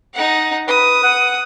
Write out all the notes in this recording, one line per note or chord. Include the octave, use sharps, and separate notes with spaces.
D#4 F#5
B4 D#6
F#5